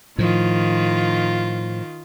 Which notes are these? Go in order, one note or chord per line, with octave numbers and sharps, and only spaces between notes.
A2 D#3 F3 F4